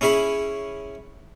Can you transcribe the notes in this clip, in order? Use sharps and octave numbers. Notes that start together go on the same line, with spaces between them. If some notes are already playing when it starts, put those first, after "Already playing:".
C#4 E4 G#4 C#5 B5